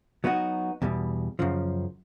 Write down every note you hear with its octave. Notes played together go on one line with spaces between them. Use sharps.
F#3 B3 D#4 F#4
E2 B2 G3
F#2 C#3 F3